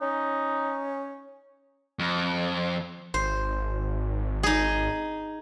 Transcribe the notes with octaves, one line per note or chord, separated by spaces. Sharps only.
C#4 D#4
F2
G#1 C5
D#4 G#4